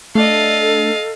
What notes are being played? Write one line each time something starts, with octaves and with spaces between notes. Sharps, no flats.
A3 D4 A4 D#5 F5